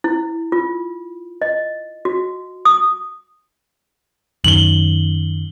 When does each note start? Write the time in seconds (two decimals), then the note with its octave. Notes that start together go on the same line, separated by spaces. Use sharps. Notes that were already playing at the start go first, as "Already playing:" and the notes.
0.04 E4
0.52 F4
1.42 D#5
2.05 F#4
2.65 D#6
4.44 F#2 D#3 F#7 G7